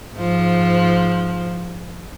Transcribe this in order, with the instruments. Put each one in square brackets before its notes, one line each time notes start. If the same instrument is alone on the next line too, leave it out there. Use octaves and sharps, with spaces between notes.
[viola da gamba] G#2 F3